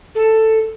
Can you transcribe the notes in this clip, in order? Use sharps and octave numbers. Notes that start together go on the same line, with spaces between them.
A4